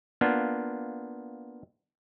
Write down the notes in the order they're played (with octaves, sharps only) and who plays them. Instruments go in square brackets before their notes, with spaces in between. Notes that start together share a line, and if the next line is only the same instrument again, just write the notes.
[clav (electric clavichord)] A#3 B3 D4 F4